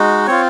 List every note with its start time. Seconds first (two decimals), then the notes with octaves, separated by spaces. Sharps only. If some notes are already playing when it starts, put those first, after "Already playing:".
Already playing: G#3 D#4 F#4
0.27 C4 F4 C#5